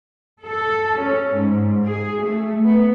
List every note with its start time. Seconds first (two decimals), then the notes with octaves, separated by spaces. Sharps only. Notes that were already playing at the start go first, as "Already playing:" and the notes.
0.46 A4
1.00 C#4
1.36 G#2
1.86 G#4
2.23 A3
2.64 B3